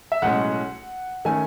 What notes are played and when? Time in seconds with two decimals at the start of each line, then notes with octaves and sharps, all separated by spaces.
0.12 E5
0.22 B1 A2 G#3 C#4 F#5
1.25 D#3 A3 C#4 G#5